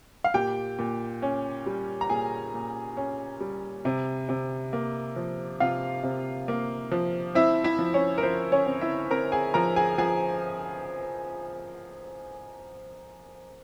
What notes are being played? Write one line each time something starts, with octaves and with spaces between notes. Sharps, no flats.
F5
A#2 G4 G5
A#2
C#4
G3
A#5
A#2 G#4 G#5
A#2
C#4
G3
C3
C3
A#3
F3
C3 F4 F5
C3
A#3
F3
C4 E4 E5
E4 E5
F3
C#4 C#5
A#4
F3 C5
C#4 C#5
C4
E4 E5
C4 A#4 A#5
G#4 G#5
F3 A#4 A#5
G#4 G#5
F3 G#4 G#5